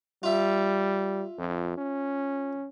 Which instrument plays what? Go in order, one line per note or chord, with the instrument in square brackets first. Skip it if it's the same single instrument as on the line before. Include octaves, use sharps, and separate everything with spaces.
[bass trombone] G3 [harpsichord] F4 E5
[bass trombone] F2
C#4